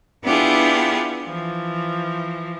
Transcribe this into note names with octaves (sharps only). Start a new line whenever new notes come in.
B3 D4 E4 F4 G4 G#4
E3 F3